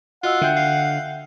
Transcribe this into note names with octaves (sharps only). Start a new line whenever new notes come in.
F4 F#4 D#5 F#5 E6
D3 E5 G5 G6
F5